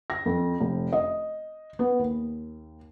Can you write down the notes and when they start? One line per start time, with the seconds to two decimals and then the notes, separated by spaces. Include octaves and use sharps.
0.10 A#6
0.26 F2
0.61 F1
0.93 D#5
1.79 B3
1.99 D#2